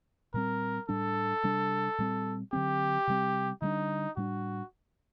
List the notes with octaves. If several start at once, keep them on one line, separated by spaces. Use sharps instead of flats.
A#2 G3 C4 A#4
A2 G3 D4 A4
C3 G3 D4
A#2 G3 C4
D3 F#3 C4 G4
C3 G3 C4
D3 G3 D4 D#4
A2 G3 D4 F#4